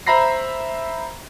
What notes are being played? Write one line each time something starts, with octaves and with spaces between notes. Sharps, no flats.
C5 E5 A#5 B5 A#6 C7